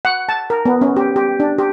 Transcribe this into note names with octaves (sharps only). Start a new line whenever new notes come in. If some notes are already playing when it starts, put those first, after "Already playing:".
F#5
A5
A#4
B3
C#4
G4
G4
D4
G4